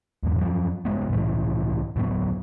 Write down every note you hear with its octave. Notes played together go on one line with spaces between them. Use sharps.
D#1 E2 G#2
F#2 F3
G2 G#3 B3
C2 A2 E3
D2 A2 F#3 B3